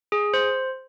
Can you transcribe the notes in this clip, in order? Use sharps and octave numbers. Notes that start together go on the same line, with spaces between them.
G#4
C5